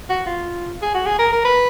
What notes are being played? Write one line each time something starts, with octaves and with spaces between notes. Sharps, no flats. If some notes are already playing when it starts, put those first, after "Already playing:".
F#4
F4
G#4
F#4
G#4
A#4
A#4
B4